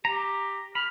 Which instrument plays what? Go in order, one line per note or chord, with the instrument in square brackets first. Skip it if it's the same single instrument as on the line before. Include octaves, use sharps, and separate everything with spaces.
[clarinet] G4 [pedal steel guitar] A#5
[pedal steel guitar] B5 [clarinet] F6